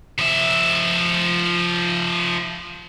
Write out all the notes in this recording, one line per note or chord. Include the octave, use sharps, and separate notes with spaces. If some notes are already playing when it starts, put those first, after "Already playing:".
F3 E5